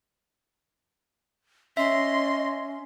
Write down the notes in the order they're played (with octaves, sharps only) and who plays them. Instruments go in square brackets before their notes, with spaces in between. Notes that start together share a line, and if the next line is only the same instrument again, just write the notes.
[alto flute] C#4 [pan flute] D#5 [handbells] E5 [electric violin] C6